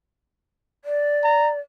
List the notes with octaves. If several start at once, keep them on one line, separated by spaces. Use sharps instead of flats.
D5
A#5